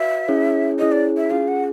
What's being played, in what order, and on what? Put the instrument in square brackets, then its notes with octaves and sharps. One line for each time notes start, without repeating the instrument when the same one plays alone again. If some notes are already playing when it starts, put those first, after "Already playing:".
Already playing: [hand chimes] F#4 B4 D5 F5 [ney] E5
[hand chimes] C#4 E4 G#4 C#5
[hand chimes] C#4 E4 G#4 C#5 [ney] D#5
[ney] D5
E5
[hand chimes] C#4 F4 G#4 [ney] F5
[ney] F#5